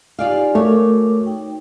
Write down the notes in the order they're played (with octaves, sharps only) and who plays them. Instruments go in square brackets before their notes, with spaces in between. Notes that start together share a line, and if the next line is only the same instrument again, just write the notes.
[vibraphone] D#4 G4 G#5 [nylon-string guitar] F4 D5 F5
[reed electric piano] A3 [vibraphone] F#4 A#4 D6 [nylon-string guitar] C#5
[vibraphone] D#4 G5